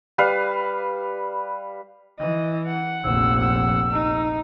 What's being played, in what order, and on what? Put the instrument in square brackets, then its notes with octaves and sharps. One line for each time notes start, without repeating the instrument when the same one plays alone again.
[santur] G3 B4 F5
[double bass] E3 [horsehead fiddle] D#5
[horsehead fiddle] F#5
[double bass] F1 A#1 [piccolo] E6
[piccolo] E6
[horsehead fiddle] D#4